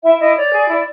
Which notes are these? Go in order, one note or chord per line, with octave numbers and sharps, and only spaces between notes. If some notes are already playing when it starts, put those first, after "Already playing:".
E4 E5
E4 D#5
C#5 D5
G#4
E4